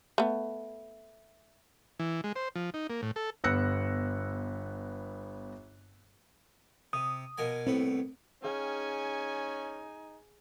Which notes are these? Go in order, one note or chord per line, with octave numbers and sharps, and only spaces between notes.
A3 B3
E3
G#3
C5
F3
D#4
A#3
A2
A4
G1 B3 E6 F#6 A#6 C#7
C3 D#6
B2 A#3 G#5
C2 A2 B3 C4
C#4 D#4 G#4 F5 G5 G#5